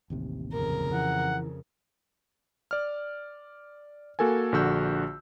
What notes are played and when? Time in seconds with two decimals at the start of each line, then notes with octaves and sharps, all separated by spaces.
0.10 A1 D#2 C3
0.53 F2 C#3 A#4
0.93 E3 F#5
2.71 D5 F6
4.19 A#3 F#4 A4 A#4 G#5
4.52 A#1 D3 F#4 E6 G6